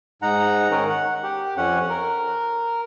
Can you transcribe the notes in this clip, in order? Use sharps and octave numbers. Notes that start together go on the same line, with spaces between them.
G#2 D#4 F#5 A#5
D#3 C#4 A#4
F#5
G4
F2 C#4 F#5
A#4